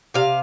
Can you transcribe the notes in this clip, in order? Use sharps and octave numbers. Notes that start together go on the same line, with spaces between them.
C3 F5